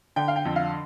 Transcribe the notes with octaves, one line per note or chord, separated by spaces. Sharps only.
D3 G5
F5
G5
F2
F5